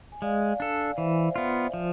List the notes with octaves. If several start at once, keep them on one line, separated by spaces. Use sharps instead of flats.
G#5
G#3 D5 F5
D4 A4
E3 C5 E5
B3 F4
F3